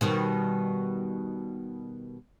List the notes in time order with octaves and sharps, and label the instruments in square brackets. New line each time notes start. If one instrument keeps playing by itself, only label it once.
[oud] B2 D#3 G3